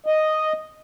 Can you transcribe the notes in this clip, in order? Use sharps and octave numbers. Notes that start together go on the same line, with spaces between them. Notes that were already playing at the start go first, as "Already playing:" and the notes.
D#5